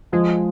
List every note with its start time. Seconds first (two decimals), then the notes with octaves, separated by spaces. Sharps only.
0.12 F3 G#3